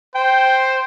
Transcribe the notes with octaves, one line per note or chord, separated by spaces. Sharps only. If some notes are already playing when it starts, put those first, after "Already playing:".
C5 G5